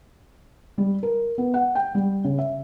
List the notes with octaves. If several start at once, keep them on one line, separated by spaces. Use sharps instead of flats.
G3
A#4
B3
F#5
G5
G3
C#3
E5